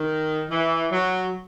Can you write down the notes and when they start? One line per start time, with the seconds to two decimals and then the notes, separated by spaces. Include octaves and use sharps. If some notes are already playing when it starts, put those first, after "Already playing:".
Already playing: D#3
0.50 E3
0.91 F#3